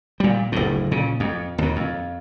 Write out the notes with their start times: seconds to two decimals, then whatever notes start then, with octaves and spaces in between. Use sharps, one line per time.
0.20 A#2 G3
0.52 F#1 D2 A2
0.91 A#2 C#3
1.20 F2
1.58 D#2 B2
1.76 F2